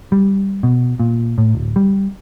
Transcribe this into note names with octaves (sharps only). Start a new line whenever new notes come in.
G3
B2
A#2
A2
D1
G3